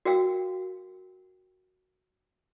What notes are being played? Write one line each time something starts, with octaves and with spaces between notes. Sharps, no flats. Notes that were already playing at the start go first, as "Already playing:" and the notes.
F#4 A#4 F5 G5 E6